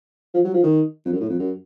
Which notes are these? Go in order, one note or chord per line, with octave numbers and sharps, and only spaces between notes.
F3
F#3
F3
D#3
F2
F#2
A2
F2
F#2